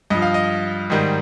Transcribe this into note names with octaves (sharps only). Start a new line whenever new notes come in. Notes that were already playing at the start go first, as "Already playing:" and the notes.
G2 F3 D#5
F5
D#5
G#2 D#3 G3